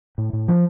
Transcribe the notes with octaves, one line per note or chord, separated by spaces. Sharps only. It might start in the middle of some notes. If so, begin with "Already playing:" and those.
A2
A2
F3